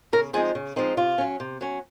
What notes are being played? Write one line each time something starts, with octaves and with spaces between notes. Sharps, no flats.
C#3 A#4
F3 G#3 C4 D#4 G#4
C#3
F3 G#3 C4 D#4
C3 F4
F#3 C#4
C3
F#3 C#4